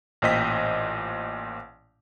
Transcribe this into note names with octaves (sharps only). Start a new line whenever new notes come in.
A1 A#2 C5 D#5 G5 B6